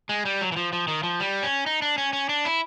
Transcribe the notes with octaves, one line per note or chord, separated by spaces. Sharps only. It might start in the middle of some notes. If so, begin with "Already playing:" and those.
G#3
G3
F#3
E3
F3
F3
D#3
F3
G3
C#4
D#4
D4
C#4
C#4
D4
E4